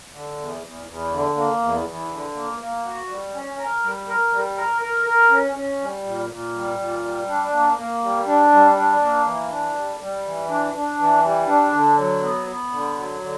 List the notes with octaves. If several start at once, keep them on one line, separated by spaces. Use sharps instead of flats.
D3
E2
E2
E2
D3
A#3
E2
E2
D3
A#3
A#3
F#4
G3
C#4
A#4
G3
A#4
G3
A#4
A#4
A#4
C#4
C#4
G3
A#2
A#2
G3
A#2
G3
D4
A#3
A#3
G3
D4
G3
D4
A#3
E3
D4
G3
G3
E3
D4
D4
E3
G3
D4
D3
F#3
B3
B3
D3
F#3
D3